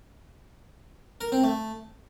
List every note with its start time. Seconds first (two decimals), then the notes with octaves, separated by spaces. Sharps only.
1.21 A#4
1.32 C4
1.44 A3